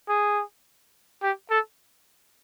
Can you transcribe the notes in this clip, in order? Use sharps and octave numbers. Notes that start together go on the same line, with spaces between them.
G#4
G4
A4